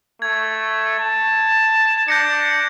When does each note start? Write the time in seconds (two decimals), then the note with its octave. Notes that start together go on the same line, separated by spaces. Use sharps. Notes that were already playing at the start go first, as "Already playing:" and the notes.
0.22 A3 G#6
0.99 A5
2.08 D4 G6 A#6 C#7